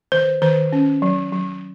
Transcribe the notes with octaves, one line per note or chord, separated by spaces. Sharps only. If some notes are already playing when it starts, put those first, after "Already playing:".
D#3 C5
D#3 C5
C#4
F#3
F#3